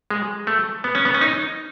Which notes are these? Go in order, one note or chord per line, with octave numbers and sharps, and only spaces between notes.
G#3
A3
B3
C#4
B3
C#4
D#4